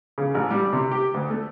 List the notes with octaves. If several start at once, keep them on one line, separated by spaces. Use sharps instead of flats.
C#3
A1
G3
C3
G4
D2
A3